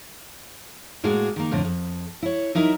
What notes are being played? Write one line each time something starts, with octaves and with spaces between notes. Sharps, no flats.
A2 G#3 A#3 F#4 G#4
D#3 A#3
F2 A2 D3
F2
E4 C#5
F#3 D#4 E4 A#4 E5